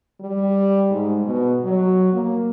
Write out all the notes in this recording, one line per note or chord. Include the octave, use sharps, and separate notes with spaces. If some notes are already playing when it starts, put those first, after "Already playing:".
G3
G#2
B2
F#3
A#3